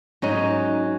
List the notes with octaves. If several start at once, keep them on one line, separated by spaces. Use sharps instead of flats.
G#2 F#3 A3 C#4 D#4